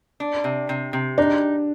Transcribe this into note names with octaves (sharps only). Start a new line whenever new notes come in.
D4
C3
C3
C3
D4 D#4